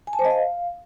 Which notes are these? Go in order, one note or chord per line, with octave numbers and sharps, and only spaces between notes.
G#5
A5
C5
D#5
F5